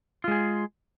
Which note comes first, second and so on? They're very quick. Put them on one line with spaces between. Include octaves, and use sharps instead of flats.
F4 G#3 G#4